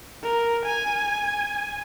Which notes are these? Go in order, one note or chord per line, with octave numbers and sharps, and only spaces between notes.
A#4
G#5